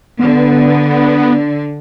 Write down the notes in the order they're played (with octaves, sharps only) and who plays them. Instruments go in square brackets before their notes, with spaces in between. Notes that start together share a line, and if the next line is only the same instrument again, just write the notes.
[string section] D3 [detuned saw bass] B3